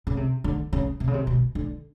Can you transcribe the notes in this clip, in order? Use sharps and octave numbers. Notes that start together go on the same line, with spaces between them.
C#3
C3
D3
C#3
C3
C#3
C3
B2
D3